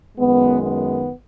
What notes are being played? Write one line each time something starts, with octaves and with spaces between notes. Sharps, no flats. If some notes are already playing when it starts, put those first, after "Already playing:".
F#2 D#3 G#3 B3
B3